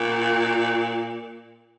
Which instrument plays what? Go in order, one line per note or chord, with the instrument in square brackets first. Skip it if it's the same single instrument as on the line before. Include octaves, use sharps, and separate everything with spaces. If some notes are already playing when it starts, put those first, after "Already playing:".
Already playing: [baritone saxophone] A#2